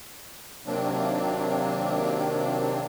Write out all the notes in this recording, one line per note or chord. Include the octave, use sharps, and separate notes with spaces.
C3 D#3 F#3 A#3 C4 D4